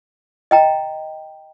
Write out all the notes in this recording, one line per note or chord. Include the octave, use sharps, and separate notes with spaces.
D#5 G5 A#5